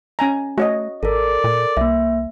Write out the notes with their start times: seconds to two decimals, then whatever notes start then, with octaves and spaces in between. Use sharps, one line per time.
0.19 C#4 G#5 A#5
0.58 A3 F#4 C#5 D#5
1.03 A1 A4 A#4 D5
1.44 A#2
1.77 C2 A#3 E5